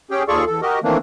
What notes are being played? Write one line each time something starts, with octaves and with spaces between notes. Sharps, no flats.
C#4 G4 G#4 G5
D#2 F4 G#4 A4 D5 C#6
E2 A4
F#4 G4 A#4 D#5
D#3 E3 A3 A#3 C4 D4